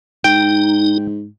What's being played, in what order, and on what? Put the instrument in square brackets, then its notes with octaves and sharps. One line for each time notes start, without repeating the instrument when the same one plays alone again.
[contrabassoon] G#2 [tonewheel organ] D#4 [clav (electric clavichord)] G5